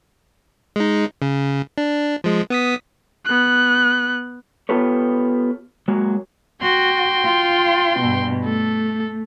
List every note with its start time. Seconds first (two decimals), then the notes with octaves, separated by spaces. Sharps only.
0.76 G#3 D#4
1.22 C#3
1.78 D4
2.24 F3 G#3
2.50 B3 D#6 B6
3.25 B3 F#6
4.69 B3 F4 G4 A4 B4 C#5
5.88 F#3 G#3 A#3 F#4
6.62 F#4 G5 C6
7.24 F4
8.00 G2 B2
8.45 A3 A4